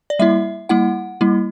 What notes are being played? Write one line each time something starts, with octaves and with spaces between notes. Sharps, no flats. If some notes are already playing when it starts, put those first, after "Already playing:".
D5
G3 A#3 E4 E5
G3 A#3 E4 F#5
G3 A#3 E4